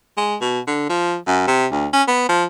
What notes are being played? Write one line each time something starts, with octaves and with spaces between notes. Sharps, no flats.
G#3
B2
D3
F3
F#2
C3
D2
C#4
B3
F3